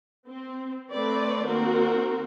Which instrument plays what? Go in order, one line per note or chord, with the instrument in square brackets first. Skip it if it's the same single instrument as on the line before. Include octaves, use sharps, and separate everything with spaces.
[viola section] C4
A3 C4 B4 D5
D#3 A#3 C4 F#4 A#4